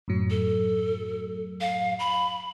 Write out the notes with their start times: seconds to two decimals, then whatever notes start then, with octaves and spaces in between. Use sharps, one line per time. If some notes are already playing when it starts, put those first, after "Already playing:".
0.08 F#2 A2 F#3
0.30 A4
1.61 F5
1.99 B5